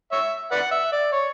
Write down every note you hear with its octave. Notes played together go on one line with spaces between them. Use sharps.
C#5 E5
B4 D5 F#5
E5
D5
C#5